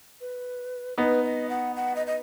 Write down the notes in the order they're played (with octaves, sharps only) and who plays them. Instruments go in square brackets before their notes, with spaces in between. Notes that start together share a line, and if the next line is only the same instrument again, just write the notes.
[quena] B4
[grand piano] B3 D#4 [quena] B4
[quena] D#5
F#5
F#5
D#5
D#5